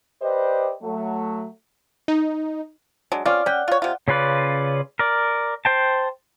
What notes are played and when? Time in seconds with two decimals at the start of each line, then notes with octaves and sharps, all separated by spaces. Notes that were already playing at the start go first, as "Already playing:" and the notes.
0.22 G4 B4 C5 D5 D#5
0.83 F#3 A3
2.08 D#4
3.12 F#3 G#3 D4
3.26 C4 C#4 F4 D5 F6
3.46 C#4 F#5 G5
3.68 F4 C#5
3.82 C3 F4
4.08 C#3 C#4 F4 B4 D5
4.99 A#4 D5
5.65 C5 G5 A5